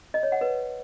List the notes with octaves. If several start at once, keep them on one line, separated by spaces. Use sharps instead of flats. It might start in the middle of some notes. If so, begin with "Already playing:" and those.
D#5
C#5
F#5
B4